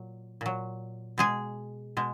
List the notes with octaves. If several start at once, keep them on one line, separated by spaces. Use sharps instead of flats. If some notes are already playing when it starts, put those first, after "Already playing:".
Already playing: A#2 F#3
A#2 F#3
B2 G#3 G#4
B2 G#3